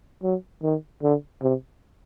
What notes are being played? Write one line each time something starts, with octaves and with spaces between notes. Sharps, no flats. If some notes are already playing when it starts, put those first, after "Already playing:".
F#3
D#3
D3
C3